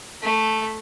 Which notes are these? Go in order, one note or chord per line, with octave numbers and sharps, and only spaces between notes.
A3